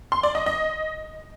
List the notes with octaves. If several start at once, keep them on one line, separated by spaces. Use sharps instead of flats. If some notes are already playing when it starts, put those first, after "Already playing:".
C6
D5
D#5
D#5